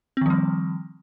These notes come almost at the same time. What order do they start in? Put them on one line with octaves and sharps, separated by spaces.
C4 D#3 F3 G3